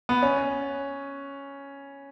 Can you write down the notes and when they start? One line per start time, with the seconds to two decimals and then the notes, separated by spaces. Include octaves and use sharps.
0.09 B3
0.22 C#4